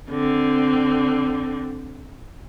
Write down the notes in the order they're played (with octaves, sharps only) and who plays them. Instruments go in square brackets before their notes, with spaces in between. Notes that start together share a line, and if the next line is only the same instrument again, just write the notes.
[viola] D3 C4